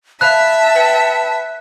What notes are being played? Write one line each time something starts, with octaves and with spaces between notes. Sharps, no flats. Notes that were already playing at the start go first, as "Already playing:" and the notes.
E5 F5 A5 B5 F#6
B4 F#5 G5